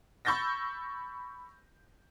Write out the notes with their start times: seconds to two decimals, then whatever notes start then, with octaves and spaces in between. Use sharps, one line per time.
0.25 B5 C#6 E6 G6 A6 A#6